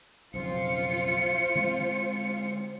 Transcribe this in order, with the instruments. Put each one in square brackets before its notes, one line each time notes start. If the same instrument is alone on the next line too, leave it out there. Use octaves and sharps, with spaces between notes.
[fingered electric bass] B1 F2 C#3 [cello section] F4 [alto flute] C5 [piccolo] C#7
[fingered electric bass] D3 G#3 C4